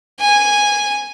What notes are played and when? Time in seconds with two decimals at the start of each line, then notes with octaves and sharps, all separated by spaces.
0.21 G#5